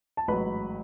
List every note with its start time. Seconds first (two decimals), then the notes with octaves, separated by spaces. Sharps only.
0.17 A5
0.28 A1 G#2 F#3 B4 B5